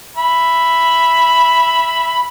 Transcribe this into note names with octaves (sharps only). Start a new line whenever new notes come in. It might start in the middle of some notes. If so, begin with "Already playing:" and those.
E5 B5